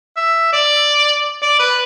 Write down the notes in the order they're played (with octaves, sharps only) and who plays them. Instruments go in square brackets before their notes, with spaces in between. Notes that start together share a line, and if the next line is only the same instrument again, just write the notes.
[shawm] E5
D5
D5
B4